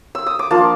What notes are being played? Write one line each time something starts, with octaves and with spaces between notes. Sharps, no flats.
E6
D#6
D6
F3 A#3 D4 F4 A5